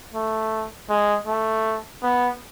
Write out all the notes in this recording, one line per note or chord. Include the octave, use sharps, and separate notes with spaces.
A3
G#3
A3
B3